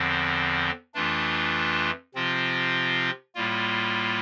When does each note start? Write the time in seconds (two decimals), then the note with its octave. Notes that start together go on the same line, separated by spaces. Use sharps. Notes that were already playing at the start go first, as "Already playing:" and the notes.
Already playing: E2 D3 F3 C4
0.94 F2 E3 A3 D4 F4
2.15 C3 F3 C4 F4
3.35 A2 G3 A#3 F4